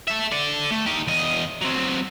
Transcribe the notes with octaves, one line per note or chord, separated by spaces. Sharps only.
A4 E5
A4 D5
A3
D#4 G4
E2 D#5
F#3 C4